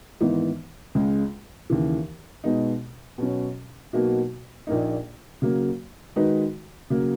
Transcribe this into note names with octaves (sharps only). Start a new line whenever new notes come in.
G#1 G#2 E3 B3 D#4
C#2 C#3 G#3
D#2 C#3 E3
B2 G#3 B3 D#4
B2 F#3 C#4
B2 F#3 A#3 D#4 F#4
A#1 A#2 A#3 D#4
C#3 F#3 A#3
D#3 G#3 D#4 F#4 B4
C#3 F#3 A#3